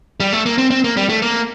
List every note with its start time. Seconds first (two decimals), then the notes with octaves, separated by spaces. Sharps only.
0.20 G3
0.33 A3
0.46 A#3
0.58 C4
0.71 C4
0.84 A#3
0.97 G3
1.09 A3
1.22 A#3